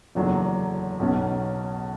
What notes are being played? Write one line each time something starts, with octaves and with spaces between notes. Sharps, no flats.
F#1 E2 D3 F#3
B1 B2 F#3 C#4